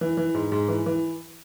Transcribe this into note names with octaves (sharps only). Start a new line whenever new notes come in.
E3
E3
G#2
G#2
E3
E3